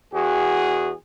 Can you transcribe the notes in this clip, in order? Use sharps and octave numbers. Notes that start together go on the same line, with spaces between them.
E2 F#4 G#4